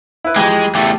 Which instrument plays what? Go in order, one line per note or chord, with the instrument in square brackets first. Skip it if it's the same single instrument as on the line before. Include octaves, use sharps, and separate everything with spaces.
[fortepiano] E4 B4
[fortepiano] F2 E3 G4 [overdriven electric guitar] G#3
[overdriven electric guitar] E2 A3 [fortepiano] G4